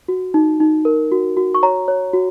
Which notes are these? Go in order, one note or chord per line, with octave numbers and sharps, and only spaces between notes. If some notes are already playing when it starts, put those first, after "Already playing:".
F#4
D#4
D#4
A#4
F#4
F#4
C#6
C#5 A#5
C#5
F#4